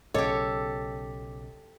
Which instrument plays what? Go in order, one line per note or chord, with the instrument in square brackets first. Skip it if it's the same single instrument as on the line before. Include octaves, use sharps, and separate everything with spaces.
[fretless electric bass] B1 C#3 [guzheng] G4 A4 [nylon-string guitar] C#5 [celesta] D#5 D6